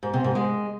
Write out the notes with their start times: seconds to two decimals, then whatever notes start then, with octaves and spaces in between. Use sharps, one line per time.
0.03 G#2
0.14 C3
0.24 G#2
0.35 G#3